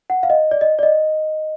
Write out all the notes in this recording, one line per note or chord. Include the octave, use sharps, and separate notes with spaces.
F#5
F5
D#5
D5
D#5
D5
D#5